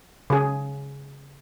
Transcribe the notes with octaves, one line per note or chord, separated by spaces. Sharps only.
C#3 G#4